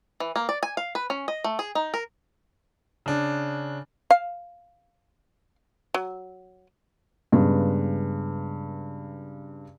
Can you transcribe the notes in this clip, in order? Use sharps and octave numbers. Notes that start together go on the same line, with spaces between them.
E3
A#3
D5
G#5
F5
B4
C#4
D#5
A3
G#4
D#4
A#4
C#3 D4
F5
F#3
G2 C#3 G#3 B3